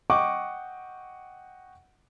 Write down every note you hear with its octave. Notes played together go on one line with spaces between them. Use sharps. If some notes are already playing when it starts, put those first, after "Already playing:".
D#5 F#5 G5 C#6 D6